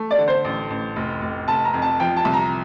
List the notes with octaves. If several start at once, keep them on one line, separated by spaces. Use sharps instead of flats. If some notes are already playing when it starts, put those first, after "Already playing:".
Already playing: A3
D5
D3
C5
A1
A1
F1
F1
F1 A5
A#5
F2
A5
F3 G5
A5
C2
A#5